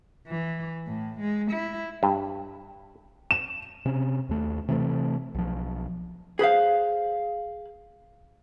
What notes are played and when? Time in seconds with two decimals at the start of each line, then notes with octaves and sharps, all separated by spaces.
0.27 E3
0.85 A2
1.19 G#3
1.50 E4
2.03 G2
3.31 E7
3.85 C3 C#4
4.29 D#2 A3
4.68 C3 E3 G#3 A3
5.35 B1 F3
6.39 G#4 B4 C5 F5